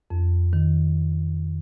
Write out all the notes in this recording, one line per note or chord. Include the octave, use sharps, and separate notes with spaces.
F2
D#3